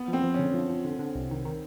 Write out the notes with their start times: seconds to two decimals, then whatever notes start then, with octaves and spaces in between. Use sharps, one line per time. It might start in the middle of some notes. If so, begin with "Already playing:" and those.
Already playing: B3
0.08 F3
0.13 C4
0.23 F3
0.34 D3 C#4
0.54 F3
0.69 F3
0.85 D3
0.99 D3
1.15 C2
1.31 D#3
1.45 D#3